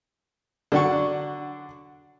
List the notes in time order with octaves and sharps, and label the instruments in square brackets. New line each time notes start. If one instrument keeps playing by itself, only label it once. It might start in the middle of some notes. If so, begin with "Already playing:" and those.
[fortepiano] D3 F#3 D4 F#5 C#6